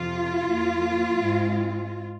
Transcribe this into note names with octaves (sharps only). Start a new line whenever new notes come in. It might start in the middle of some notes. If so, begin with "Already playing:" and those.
Already playing: F2 C3 F3 F4
F2 F3 A#3
G#2 G#3 C4